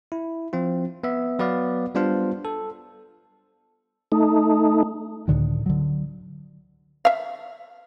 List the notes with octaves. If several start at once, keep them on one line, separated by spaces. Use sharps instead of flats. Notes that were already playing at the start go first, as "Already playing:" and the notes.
E4
F3 C4 F4
B3 E5
F#3 B3 B4 D5 F5
G3 B3 D4 F4 C5 F5
A4
A3 D#4
C#2 A2 D3 D#3
D3 F#3
E5 F5